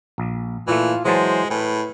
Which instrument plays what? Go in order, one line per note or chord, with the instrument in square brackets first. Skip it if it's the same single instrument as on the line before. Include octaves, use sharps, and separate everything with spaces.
[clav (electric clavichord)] A#1
[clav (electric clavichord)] A#2 A3 [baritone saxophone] E3 [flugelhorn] F4
[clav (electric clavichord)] E3 F#3 A5 [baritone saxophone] G#3 [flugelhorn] C5
[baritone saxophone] A2 [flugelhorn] B4 [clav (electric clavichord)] G#5